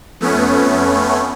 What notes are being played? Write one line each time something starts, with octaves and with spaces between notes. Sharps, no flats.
F2 A3 B3 C#4